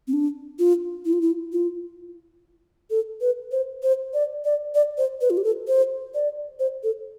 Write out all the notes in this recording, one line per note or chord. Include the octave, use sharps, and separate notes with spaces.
C4
D4
F4
E4
F4
E4
F4
A4
B4
C5
C5
D5
D5
D5
C5
B4
F4
G4
A4
C5
D5
C5
A4